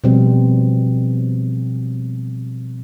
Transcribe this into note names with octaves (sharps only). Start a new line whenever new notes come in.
B2 F3 G3 C4